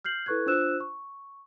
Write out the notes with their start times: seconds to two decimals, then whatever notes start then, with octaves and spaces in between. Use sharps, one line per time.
0.05 F6 G6 C7 F#7
0.26 E4 A4 B4 C#6 F#6 G#6
0.46 D4 F4 C5 E6 F#6 E7
0.80 C#6